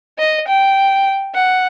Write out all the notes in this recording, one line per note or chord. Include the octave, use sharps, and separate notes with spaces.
D#5
G5
F#5